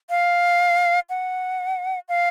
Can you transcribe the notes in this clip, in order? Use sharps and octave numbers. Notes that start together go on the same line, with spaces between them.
F5
F#5
F5